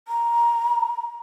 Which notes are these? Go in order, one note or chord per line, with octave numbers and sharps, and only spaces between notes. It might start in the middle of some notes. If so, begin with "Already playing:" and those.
A#5